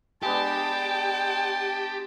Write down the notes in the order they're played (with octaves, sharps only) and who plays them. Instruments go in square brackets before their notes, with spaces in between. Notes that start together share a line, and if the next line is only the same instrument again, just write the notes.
[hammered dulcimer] G#3 B3 D4 [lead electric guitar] G4 [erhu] G5 [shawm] A5